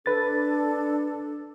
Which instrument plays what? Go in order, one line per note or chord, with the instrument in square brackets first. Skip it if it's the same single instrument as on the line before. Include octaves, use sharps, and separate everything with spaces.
[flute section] D4 A4 [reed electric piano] B4 A6